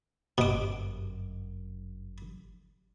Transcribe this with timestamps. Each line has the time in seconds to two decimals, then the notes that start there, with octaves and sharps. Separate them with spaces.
0.38 G1 F#2 B2 D6